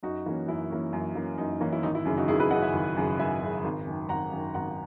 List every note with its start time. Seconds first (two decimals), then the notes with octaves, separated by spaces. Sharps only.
0.03 F#2 D#4 F#4
0.26 E3 A#3 C#4
0.48 F#2 E4
0.70 E3 A#3 C#4
0.93 F#2
1.15 E3 A#3 C#4
1.38 F#2 D#4
1.61 E3 A#3 C#4
1.73 E4
1.83 G#1 D#4
1.95 E4
2.06 F#2 C#3
2.17 D#4 F#4
2.28 G#1 E4 G#4
2.40 G#4 B4
2.51 F#2 D#5 F#5
2.54 C#3
2.62 E5 G#5
2.73 G#1
2.97 F#2 C#3
3.19 G#1 E5 G#5
3.41 F#2 C#3
3.64 G#1
3.87 F#2 D#3
4.09 G#1 F#5 A#5
4.32 F#2 D#3
4.54 G#1 F#5 A#5